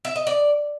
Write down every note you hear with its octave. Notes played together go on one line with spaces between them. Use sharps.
E5
D#5
D5